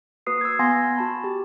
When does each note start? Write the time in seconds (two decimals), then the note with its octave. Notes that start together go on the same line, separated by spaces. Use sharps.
0.27 A#3 F#4 B4 D#6 C7
0.41 E6 G#6
0.59 B3 F5 G#5 C6 G#6 A#6
0.97 F#4 A5 B5
1.24 G4